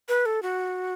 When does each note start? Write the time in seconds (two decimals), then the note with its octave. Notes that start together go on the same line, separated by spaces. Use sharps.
0.09 B4
0.26 A4
0.42 F#4